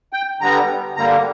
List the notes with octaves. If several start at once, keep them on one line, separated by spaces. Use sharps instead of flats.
G5
D3 G3 B3 A#5
G2 D3 G3 A#3 A#5